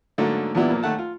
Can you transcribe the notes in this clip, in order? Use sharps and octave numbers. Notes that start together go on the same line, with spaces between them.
G#2 D3 F#3 A3 A#3
E2 A#2 G3 B3 D4 E4
A#2 F3 A#3
D#2 A3 F#5 A5
F4